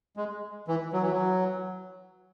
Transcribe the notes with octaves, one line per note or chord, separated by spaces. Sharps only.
G#3
E3
F#3
E3
F#3